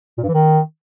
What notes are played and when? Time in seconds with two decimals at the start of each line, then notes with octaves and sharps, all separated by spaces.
0.18 A#2
0.23 G2
0.28 E3
0.34 D#3